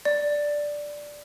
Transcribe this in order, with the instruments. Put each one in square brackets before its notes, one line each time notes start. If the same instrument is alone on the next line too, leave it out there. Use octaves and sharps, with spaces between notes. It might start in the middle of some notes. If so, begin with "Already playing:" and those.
[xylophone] D5